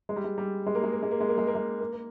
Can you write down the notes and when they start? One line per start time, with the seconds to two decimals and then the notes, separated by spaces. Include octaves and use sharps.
0.09 G#3
0.16 G3
0.24 G#3
0.38 G3
0.66 G#3
0.75 A#3
0.83 G#3
0.93 A#3
1.03 G#3
1.11 A#3
1.20 G#3
1.29 A#3
1.38 G#3
1.47 A#3
1.55 G#3
1.80 A#3
1.93 A#3